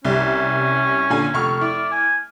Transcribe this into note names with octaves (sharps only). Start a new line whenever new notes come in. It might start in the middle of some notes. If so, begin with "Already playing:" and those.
C2 G3 C#4
A#2 D3 G#5
F1 C#6 F6
E4 D5
G#5